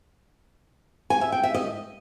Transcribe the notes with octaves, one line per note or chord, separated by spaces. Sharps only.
G#5
E5
G5
E5
D#5